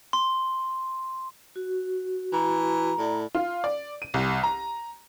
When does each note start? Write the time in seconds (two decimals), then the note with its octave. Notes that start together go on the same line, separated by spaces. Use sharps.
0.13 C6
1.56 F#4
2.33 E3 A#5
2.98 A2 D5
3.35 F4
3.64 D5
4.02 D#7
4.14 C2
4.43 A#5